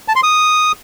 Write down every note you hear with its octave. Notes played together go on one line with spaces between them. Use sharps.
A5
C6
D#6